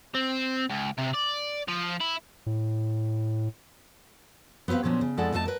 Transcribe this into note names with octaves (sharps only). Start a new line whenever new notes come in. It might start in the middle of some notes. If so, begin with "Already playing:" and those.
C4
C#2
C3
D5
F3
E4
A2
B3 C4 G4 B4 F5
A#2 F3 F#3 C#4 D4
C#3
F2 G#3 E4 A4 D5 F#5
F2 A3 D#4 A4 A5
A#4 B4